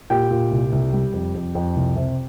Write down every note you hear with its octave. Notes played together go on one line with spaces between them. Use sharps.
A#2 G4 G5
A#2
C2
C2
G3
F2
F2
F2
C2
C3